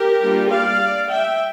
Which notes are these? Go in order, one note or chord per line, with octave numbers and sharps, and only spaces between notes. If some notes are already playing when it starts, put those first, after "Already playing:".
Already playing: G4 A#4
G3 A#3 D4 F4
D5 F5
E5 G5